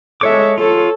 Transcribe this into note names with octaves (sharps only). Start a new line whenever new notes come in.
G#3 A4 C#5 E5 D6
F4 A4 C#5